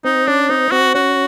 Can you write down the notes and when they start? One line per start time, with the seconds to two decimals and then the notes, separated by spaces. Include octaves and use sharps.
0.04 C4 D#4
0.27 C#4 D4
0.49 C4 D#4
0.71 C4 F#4
0.94 C#4 F#4